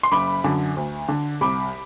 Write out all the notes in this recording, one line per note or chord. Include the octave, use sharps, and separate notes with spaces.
C6
F#1 B5 D6
F#2 D3
D2
D3
C2 B5 D6